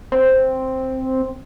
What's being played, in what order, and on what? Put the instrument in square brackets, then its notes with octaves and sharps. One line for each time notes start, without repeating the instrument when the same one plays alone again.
[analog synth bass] C4